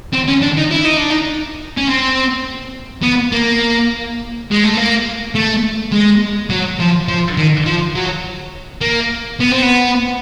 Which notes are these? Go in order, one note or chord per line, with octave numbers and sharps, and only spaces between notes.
C4
C#4
D4
D#4
E4
D#4
D4
D#4
C#4
C4
B3
A#3
G#3
A3
A#3
A3
G#3
F#3
F3
F3
D#3
F3
F#3
A#3
B3
C4
B3